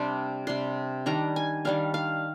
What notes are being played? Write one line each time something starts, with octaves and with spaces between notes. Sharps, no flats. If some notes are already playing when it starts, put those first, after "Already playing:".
Already playing: C3 G3 D4 C6
C3 G3 D4 C6
D#3 G3 D4 A#5
G#5
D#3 G3 D4 F5
F5